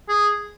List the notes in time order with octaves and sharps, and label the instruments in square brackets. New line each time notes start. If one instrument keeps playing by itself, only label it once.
[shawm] G#4